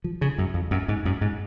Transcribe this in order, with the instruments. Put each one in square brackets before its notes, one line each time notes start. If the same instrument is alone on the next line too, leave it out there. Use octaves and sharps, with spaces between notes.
[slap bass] F3
C#3
F#2
F2
F#2
G#2
F#2
G#2